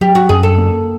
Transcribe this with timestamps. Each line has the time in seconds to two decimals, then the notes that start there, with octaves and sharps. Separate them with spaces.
0.01 F#3 G4
0.15 F#4
0.29 F#2 G#4
0.43 A4
0.58 A#3